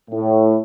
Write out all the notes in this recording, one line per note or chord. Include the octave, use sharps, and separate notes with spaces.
A2